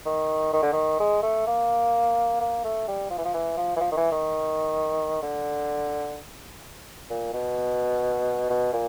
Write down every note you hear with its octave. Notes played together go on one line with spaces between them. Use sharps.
D#3
D#3
D3
D#3
G#3
A3
A#3
A#3
A3
G3
F3
E3
F3
E3
F3
E3
F3
D#3
E3
D#3
D3
A#2
B2
B2
A#2